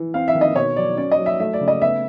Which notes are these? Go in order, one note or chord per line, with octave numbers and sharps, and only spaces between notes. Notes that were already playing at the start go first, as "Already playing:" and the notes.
Already playing: E3
C4 F5
E5
D#3
D#5
B2 C#5
F#3 D5
C#4 D5
D#5
F#3
E5
A3 E5
D5
C#3
D#5
B3 E5